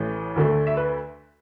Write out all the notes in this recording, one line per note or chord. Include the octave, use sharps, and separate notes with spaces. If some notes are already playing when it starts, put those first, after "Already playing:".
Already playing: A1 A2 E3
D2 D3 A3
E5
B4